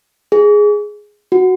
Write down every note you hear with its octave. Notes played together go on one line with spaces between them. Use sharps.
G#4
F#4